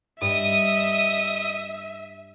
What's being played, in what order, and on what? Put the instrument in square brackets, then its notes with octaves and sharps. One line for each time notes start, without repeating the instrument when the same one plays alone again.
[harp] G2 [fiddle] D#5 D#6 [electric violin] E5